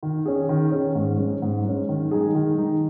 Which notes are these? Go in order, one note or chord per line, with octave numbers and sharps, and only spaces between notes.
D#3
C#4 G#4
D#3
C#4 G#4
G#2
G#3 C#4
G#2
G#3 C#4
D#3
G#3 D#4 G#4
D#3
G#3 D#4 G#4